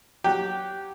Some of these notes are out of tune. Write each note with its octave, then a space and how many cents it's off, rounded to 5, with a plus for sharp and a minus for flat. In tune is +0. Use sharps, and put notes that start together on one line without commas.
F#3 +0 G4 -10